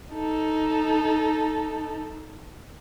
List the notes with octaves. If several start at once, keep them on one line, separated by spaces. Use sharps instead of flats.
D#4 A4